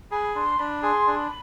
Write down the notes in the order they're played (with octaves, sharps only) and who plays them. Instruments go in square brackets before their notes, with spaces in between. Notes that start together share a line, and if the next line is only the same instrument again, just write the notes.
[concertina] G#4 [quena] B5
[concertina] D4 [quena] C6
[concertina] D4 [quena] B5
[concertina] G#4 [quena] C6
[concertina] D4
[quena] B5